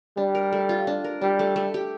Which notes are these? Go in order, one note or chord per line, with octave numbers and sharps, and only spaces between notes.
G3 D4
A#4
A3
F4
D4
A#4
G3 D4
A3
A3
G4